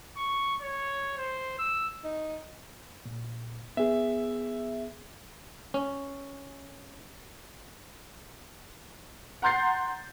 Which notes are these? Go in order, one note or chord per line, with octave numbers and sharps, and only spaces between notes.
C#6
C#5
C5
E6
D#4
A#2
B3 G#4 E5
C#4
F#5 A#5 C6 G6 A6 C7